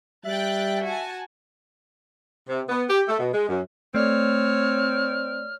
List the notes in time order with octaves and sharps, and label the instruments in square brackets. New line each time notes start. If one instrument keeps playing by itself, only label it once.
[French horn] G3 [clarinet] E5 [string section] G5 F#6 A6
[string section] F#4 G#5 A5
[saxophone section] C3
B3
G4
A3
B2
G#3
F#2
[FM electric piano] A3 D5 [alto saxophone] C4 [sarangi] C#5 [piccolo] F6